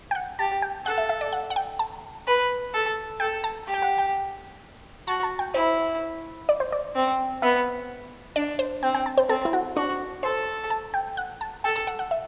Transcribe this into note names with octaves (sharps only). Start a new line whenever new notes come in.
G5
F#5
G4 A5
G5
A4 F#5
E5
E5
D5
F#5
F#5
G5
A5
B4
A4
A4 G5
A5
G4
G5
F#5
G5
F#4 A5
A5
G5
E4 C5
D5
C5
D5
C4
B3 E5
D4 D5
C5
C4 G5
G5
A5
C5
C4 A4
E4
F#4
D4 F#4
A4 C5
A5
G5
F#5
A5
A4 G5
A5
F#5
F#5
E5